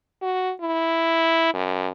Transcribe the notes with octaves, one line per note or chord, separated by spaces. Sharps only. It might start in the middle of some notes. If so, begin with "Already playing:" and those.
F#4
E4
F#2